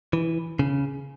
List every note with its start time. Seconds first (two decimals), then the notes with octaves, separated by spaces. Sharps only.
0.13 E3
0.59 C#3